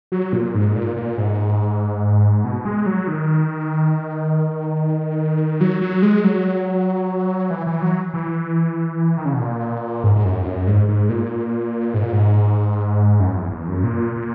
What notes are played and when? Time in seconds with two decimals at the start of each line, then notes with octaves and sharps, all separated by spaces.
0.12 F#3
0.33 A#2
0.55 G#2
0.76 A#2
0.96 A#2
1.17 G#2
2.44 B2
2.65 G#3
2.86 F#3
3.08 D#3
5.61 F#3
5.82 F#3
6.02 G#3
6.24 F#3
7.50 E3
7.66 E3
7.82 F#3
8.14 E3
9.17 D#3
9.25 C#3
9.33 B2
9.41 A#2
10.03 G#2
10.15 G#2
10.25 F#2
10.42 E2
10.46 F#2
10.67 G#2
10.88 G#2
11.09 A#2
11.94 G#2
12.03 A#2
12.13 G#2
13.20 F#2
13.36 E2
13.52 E2
13.68 F#2
13.84 A#2
14.15 A#2